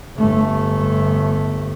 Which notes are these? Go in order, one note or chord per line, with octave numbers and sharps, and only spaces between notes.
G1 A3